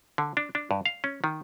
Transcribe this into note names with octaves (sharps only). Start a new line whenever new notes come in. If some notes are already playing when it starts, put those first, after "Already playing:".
D3
D4
D4
G2
F5
C#4
D#3